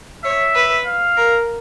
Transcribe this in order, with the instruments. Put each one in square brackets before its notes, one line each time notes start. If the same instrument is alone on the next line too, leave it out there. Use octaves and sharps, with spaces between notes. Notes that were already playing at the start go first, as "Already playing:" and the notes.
[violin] C#5 [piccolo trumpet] E5
[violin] B4
[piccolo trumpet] F5
[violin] A#4